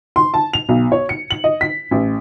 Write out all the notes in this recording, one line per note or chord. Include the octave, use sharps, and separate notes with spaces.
C6
A5
F7
B1
C#5
C#7
F#7
D#5
B6
A1